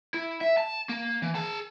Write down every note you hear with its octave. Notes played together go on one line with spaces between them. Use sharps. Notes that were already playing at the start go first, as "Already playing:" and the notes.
E4
E5
A5
A#3
E3
G#4 A5